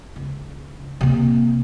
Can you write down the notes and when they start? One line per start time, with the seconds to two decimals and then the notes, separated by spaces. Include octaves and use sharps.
0.16 C#2
1.01 C3 A#3